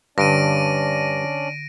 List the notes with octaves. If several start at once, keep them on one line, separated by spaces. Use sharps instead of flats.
G2 D3 C#4 D4 D5 A#6 D7 D#7